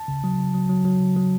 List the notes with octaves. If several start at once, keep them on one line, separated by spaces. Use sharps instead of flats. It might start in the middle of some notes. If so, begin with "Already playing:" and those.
Already playing: A5
C#3
F#3
C#3
F#3
F#3
F#3
C#3
F#3